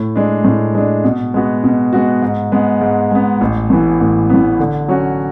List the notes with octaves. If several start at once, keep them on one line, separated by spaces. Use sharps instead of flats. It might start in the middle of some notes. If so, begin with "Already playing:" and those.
Already playing: A2
G#3 D4
A2
G#3 D4
B2
G#3 B3 F#4
B2
G#3 B3 F#4
G#2
G#3 B3
G#2
G#3 B3
A1
A2 E3 B3
A1
A2 E3 B3
D3
F#3 C#4 F#4